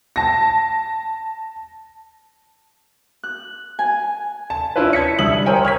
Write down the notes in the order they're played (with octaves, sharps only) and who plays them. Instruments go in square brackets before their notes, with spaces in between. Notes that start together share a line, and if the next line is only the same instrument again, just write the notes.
[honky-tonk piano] A5 A#6
[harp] F#6
G#5
[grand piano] A5
C#4 D4 E4 F4 B4
A5 G#6 B6 C#7
C2 D3 E5 D#6 E6 F#7
A#4 C5 C#5 G5 G#5
C#6 F6 G#6 B6